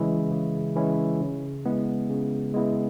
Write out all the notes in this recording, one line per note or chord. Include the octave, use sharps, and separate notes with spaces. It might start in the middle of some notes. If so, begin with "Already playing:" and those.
Already playing: C#3 E3 G#3 C#4 E4
C#3
E3 G#3 C#4 E4
C#3
G#3 B3 E4
C#3
G#3 B3 E4